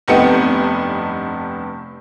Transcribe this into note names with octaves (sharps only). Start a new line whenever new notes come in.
F1 G2 B3 C4 D#4 C#7